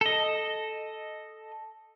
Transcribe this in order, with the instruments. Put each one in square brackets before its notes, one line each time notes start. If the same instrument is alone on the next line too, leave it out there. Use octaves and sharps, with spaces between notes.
[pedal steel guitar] A4 D#5